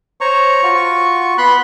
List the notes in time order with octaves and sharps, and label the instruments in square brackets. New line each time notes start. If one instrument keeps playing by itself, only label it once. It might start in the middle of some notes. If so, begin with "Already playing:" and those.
[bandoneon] C5 C#5 A#5 [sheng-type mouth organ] C#6
[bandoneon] F4 F#4
[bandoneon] B3 C6 F#6 [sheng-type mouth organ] B5